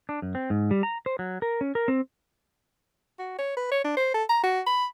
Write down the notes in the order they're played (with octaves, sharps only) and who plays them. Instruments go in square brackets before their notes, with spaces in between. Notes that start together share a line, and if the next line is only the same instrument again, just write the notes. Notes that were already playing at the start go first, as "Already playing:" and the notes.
[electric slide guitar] D4
F#2
C4
G#2
G3
A#5
C5
F#3
A#4
C#4
A#4
C4
[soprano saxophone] F#4
C#5
B4
C#5
D4
C5
A4
A#5
F#4
B5